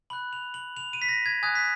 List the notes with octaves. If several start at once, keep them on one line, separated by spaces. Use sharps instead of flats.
B5 F#6 F#7
F7
F#7
F7
D#7
B6
A#6
G#6
G#5 D#6 F#6 G#6
B6